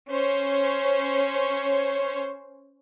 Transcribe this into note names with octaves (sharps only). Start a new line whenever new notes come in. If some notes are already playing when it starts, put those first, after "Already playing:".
C#4 C5 C#5